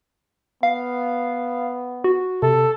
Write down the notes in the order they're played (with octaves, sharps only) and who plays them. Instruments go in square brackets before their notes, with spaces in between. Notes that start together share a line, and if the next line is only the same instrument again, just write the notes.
[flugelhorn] B3 [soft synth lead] F5
[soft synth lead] F#4
[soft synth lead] C3 [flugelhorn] A4